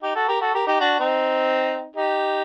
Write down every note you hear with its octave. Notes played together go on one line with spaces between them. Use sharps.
D#4 G4
F#4 A4
G4 A#4
F#4 A4
G4 A#4
D#4 G4
D4 F#4
C4 D#4
D#4 G4